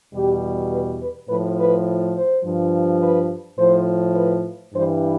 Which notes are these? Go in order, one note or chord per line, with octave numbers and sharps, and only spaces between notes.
E2 B2 G3 G4
B4
B4
A2 F3 B4
B4
C5
G2 F3
B4
A2 F3 C5
B4
G2 E3 G3 C5